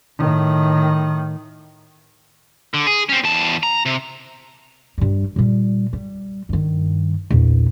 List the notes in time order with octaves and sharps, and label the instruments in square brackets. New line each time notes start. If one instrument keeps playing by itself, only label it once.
[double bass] A2 D#3
[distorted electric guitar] D3
G#4
C4 C#4
E2 A5
A#5
C3
[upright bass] G2 G3
A#2 G3
G3
G2 D#3
A#1 E2